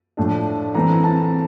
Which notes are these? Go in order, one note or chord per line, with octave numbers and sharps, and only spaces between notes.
A2 F3 A3 D4
E3 A3 C4 A#5
A5